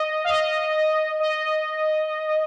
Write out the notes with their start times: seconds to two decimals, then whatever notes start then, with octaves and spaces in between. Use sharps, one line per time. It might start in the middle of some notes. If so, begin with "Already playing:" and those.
Already playing: D#5
0.24 F5
0.29 D#5
1.20 D#5